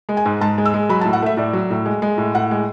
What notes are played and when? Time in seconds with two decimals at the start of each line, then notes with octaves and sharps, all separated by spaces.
0.09 G#3
0.17 G#5
0.26 G#2
0.41 G#2 A5
0.58 G#3
0.65 E6
0.74 G#3
0.89 F#3 B5
1.01 A5
1.05 A2
1.13 F#5
1.22 A3 E5
1.37 A2 D5
1.53 F#3
1.71 A2
1.86 G#3
2.02 G#3
2.18 A2
2.35 A2 F#5
2.51 G#3